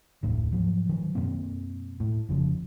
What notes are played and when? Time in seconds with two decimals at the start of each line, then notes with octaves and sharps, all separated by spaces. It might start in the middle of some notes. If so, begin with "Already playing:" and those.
0.23 F1 D2 A2 D3
0.52 G#2 F3 F#3
0.89 D#3 F#3
1.15 F#2 B2 A#3 C4
2.00 A2
2.29 F1 C#3 F3